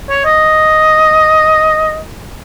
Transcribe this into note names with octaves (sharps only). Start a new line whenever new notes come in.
C#5
D#5